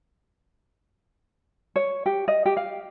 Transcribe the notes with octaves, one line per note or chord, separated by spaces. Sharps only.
C#5
G4
D#5
G4
F5